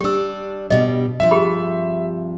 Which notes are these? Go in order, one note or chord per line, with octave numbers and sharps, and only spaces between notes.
G3 D4 G4 E6
G2 B2 G3 D#5
G2 C3 F3 E5
G4 G#4 B5